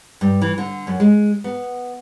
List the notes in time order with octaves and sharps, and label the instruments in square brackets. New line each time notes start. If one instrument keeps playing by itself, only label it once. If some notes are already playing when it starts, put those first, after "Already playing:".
[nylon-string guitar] G2
E3
D3
F#2
G#3
B3